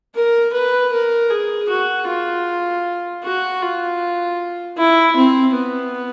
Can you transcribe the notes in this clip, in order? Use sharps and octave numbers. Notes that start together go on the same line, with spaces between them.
A#4
B4
A#4
G#4
F#4
F4
F#4
F4
E4
C4
B3